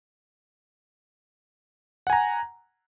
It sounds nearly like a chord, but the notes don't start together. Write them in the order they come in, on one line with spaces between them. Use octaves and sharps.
F#5 G#5 A#5